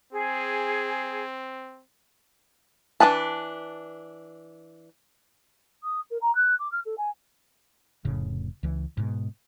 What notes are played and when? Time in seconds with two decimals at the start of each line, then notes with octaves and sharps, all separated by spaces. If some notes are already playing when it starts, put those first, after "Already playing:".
0.13 C4 G#4
3.00 E3 D4 G#4 B4 A5
5.83 D#6
6.10 A#4
6.21 A#5
6.35 F#6
6.59 D6
6.71 F6
6.85 A4
6.98 G#5
8.05 F1 A2 C#3
8.63 C#2 E3
8.97 G#2 B2